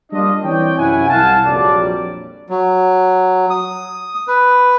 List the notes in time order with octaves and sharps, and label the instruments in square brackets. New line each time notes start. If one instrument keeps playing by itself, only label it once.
[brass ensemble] G3 A#3 D4 F4 D#5
E3 C4 C#5 D5 G5
F#2 C3 E4 F#4 F#5 G#5
C2 F5 F#5 A5
A#1 F2 F#3 G3 D5
[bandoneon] F#3
D#6
B4